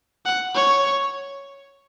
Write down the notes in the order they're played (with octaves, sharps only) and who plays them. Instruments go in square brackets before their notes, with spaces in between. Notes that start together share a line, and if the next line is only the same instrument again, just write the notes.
[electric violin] F#5
C#5